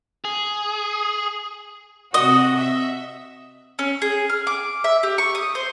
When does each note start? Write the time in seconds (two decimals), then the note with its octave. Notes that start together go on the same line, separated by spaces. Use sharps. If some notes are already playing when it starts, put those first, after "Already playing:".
0.25 G#4
2.14 C3 F#4 D#5
2.58 E5
3.79 C#4
4.02 G#4
4.29 F6
4.47 D6
4.84 E5
5.03 G4
5.18 C#6
5.35 D#6
5.55 C5